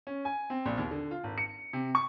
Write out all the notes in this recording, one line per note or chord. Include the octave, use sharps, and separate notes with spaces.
C#4
G#5
C4
A#1
D#2
D3
F4
G#1
C#7
C3
C#6